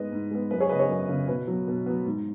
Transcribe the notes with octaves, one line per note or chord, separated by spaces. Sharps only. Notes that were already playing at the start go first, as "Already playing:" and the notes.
Already playing: G#2 G#3 B3 B4 D#5
G#2
G#3 B3
F#2 B4
G#4 C#5
C#3 B3 B4 D#5
G#4 C#5
F#2
C#3 B3
B2 B4
F#3 B3
B2
F#3 B3
G#2